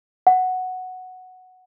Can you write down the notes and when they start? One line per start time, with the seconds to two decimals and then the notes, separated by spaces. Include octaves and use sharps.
0.27 F#5